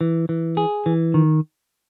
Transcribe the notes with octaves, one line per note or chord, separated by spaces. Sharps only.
E3
E3
G#4
E3
D#3